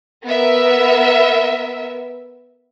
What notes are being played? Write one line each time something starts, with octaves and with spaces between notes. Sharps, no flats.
B3 A#4 E5